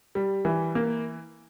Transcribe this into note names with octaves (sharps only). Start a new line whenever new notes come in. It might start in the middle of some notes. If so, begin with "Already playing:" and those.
G3
E3
A#3